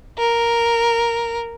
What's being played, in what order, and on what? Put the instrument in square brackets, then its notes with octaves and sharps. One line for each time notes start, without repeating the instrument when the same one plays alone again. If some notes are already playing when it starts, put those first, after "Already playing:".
[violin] A#4